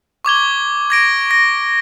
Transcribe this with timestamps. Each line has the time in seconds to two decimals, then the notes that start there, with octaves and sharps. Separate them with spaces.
0.25 C#6 D6 G#6 G7
0.90 G#6 A#6 D7
1.31 A#6